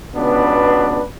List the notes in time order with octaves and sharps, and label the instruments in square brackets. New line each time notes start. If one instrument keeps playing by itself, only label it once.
[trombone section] C#2 B2 B3 D4 B4